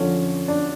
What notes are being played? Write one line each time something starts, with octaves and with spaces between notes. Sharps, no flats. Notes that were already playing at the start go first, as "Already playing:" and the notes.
Already playing: F2 D3 F3 C#4
D4